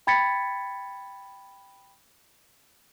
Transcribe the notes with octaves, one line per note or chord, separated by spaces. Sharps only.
G5 B5 G#6 A6 B6 C#7